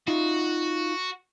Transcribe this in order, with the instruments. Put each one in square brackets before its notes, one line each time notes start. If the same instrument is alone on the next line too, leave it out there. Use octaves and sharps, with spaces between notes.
[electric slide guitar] D#4 F4 [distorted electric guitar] F#4